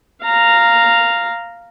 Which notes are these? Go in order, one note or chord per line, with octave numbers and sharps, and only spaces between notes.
F5 A#5